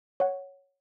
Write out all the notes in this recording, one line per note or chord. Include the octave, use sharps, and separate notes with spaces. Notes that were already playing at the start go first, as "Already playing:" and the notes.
C#5 F#5